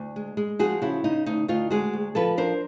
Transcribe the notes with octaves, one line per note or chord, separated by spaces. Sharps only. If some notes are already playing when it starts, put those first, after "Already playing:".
Already playing: D2
G#3
G#3
F3 F#4 G#4
C#3 E4 F#4
C#3 D#4
D2 D#4
D2 D#4 F4
G#3 F#4 G#4
D2
F3 A4 B4
D4 A#4 C5